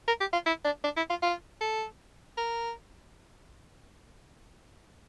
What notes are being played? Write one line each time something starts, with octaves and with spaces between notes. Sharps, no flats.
A#4
G4
F4
E4
D4
D4
E4
F4
F4
A4
A#4